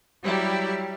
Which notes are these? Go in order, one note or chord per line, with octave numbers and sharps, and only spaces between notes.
F#3 G3 E4 G4